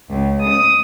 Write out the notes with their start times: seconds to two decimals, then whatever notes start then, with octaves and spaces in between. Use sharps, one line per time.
0.12 C#2
0.47 D#6